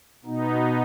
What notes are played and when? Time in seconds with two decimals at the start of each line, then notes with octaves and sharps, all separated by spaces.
0.25 B2 B3 D#4